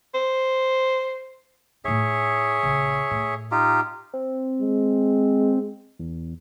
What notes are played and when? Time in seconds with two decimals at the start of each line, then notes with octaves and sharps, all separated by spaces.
0.14 C5
1.85 A2 D#4 G#4 C#5 E5
2.63 A#1 C#3
3.11 A2
3.51 D#4 F4 G4
4.14 C4
4.61 G#3
5.99 E2